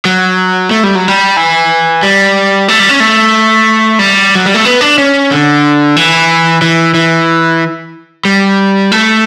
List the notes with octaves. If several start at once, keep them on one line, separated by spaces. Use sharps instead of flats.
F#3
A3
G3
F#3
G3
E3
G3
A3
G3
C#4
A3
G3
F#3
G3
A3
B3
D4
C#4
D3
E3
E3
E3
G3
A3